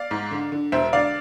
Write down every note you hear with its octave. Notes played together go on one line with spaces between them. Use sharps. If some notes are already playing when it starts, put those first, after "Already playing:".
Already playing: D5 F5
G#2
D3
D3
E1 C5 E5
D3 D5 F5